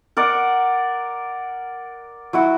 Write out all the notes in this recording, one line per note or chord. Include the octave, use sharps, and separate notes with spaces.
A#4 D5 F#5
F#3 E4 F#4